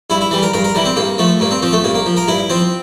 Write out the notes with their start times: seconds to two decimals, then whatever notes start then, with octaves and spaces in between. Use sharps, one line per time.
0.10 G2 E4
0.21 E4
0.31 E3 G3
0.42 A#4
0.54 G2 A#4
0.64 A#4
0.75 E3 G3
0.85 C4
0.96 G2 A#3
1.18 F3 A3
1.40 G2 A#3
1.51 C4
1.62 F3 C4
1.73 A3
1.84 G2 A#3
1.95 A#3
2.06 F3
2.17 A#4
2.28 G2 E4
2.50 F3 C4